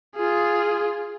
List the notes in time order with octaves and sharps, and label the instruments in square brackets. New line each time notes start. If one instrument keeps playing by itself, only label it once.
[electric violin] F4 G#4